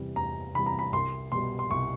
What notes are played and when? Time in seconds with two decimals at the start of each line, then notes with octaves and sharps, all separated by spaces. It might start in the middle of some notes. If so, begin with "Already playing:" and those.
Already playing: E2 C3 E3 G3
0.16 E2 A#5
0.55 C3 E3 G3 B5
0.66 A#5
0.79 B5
0.93 C2 C6
1.32 B2 G3 C6
1.59 C6
1.70 C2 C#6